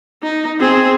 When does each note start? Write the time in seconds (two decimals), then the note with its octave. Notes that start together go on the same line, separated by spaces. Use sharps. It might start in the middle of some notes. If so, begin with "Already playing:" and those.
0.23 D#4
0.60 C4 G#4